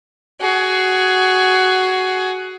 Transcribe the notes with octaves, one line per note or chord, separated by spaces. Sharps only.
F#4 G#4